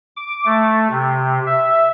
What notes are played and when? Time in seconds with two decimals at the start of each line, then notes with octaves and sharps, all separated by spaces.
0.17 D6
0.45 A3
0.90 C3
1.46 E5